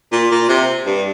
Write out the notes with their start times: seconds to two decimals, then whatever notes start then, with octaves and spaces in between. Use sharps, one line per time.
0.12 A#2
0.31 A#2
0.49 C3
0.86 G2